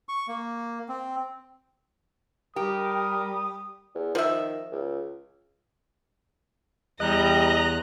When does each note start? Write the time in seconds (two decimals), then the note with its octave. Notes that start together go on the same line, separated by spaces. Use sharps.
0.09 C#6
0.28 A#3
0.89 C4
2.56 G3 G4 A#4 D#6
3.95 E2
4.15 D#3 F3 E5
4.72 C#2
7.00 E2 E3 G3 D#5 A#5 F#6